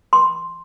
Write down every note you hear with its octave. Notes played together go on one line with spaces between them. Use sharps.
C6